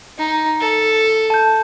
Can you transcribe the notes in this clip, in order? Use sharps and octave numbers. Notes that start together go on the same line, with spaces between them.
D#4
A4
A5 G6